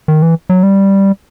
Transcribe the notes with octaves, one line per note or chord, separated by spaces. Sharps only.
D#3
E3
F#3
G3